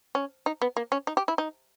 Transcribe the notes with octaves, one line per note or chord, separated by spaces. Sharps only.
C#4
D#4
B3
A#3
C#4
D#4
G4
E4
D#4